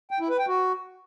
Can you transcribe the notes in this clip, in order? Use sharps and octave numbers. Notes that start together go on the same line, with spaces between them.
G5
E4
B4
G5
F#4